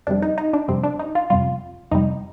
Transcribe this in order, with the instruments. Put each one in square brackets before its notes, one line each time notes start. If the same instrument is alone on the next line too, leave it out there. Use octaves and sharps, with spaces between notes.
[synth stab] F2 C3 G3 D4
D#4
D#4
D4
F2 C3 G3 C4
D4
D#4
F4
F2 C3 G3 F4
F2 C3 G3 D#4